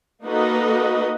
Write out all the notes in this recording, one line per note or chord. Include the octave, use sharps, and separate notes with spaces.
A#3 D#4 F#4 A4 B4 D#5